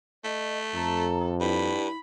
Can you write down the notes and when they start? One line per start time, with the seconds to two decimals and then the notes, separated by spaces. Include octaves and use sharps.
0.24 A3 D#5
0.75 F2 A4 A#5
1.41 G2 E4 B5